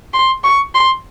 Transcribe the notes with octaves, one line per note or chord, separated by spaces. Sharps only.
C6
C#6
C6